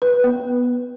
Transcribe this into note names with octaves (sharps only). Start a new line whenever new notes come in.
B4
B3